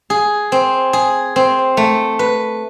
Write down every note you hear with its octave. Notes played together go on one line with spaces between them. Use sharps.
G#4
C4
G#4
C4
A3
B4